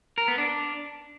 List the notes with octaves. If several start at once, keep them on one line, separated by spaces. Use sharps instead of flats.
A#4
B3
D4